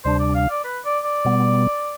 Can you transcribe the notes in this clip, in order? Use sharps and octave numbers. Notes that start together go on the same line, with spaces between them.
D2 C3 G3 D4 C5
D5
F5
D5
B4
D5
D5
B2 G3 B3